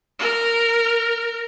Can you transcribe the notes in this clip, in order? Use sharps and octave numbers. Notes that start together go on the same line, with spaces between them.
A#4